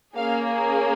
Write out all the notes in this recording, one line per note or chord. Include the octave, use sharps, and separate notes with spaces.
A#3 C#4 G#4 F5